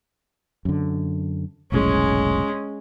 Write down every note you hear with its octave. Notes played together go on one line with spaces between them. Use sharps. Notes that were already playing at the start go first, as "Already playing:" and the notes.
F#2 D3
F1 B1 A2 G#3 C#4